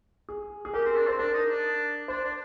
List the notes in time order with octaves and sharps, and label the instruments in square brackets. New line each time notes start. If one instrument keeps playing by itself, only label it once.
[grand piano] G#4
G#4
[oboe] G4 [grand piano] A#4
[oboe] C4
D4
[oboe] C4 [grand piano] C5
[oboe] D4 [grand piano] A#4
[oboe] D#4
D4
[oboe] D4 [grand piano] C5
[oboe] D4